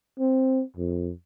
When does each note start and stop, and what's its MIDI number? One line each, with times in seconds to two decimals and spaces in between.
0.20 0.63 60
0.76 1.12 41